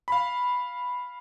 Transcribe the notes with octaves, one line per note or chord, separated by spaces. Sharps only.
F5 B5